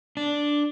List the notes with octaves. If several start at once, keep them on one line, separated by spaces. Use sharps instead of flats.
D4